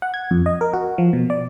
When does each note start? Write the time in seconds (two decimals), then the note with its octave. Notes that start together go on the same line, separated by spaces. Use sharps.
0.02 F#5
0.14 G#6
0.31 F2
0.46 D#5
0.61 A#4
0.74 F#4
0.98 F3
1.13 B2
1.30 D5